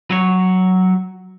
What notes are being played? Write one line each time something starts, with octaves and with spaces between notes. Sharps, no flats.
F#3 C#5